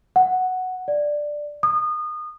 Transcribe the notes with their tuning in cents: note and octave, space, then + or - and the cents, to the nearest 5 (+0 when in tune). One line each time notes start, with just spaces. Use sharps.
F#5 +0
D5 +5
D#6 -25